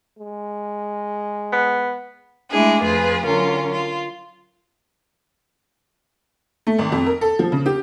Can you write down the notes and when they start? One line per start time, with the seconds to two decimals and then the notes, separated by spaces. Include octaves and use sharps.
0.19 G#3
1.52 B3
2.51 G#3 A3 D4 E4 G#4
2.84 F2 F4 G#4 B4
3.25 D3 F#3 C#4 F4 A#4
3.72 F4
6.67 A3
6.79 G#1
6.92 F2
7.06 A#4
7.21 A4
7.39 F3
7.52 C#3
7.66 G4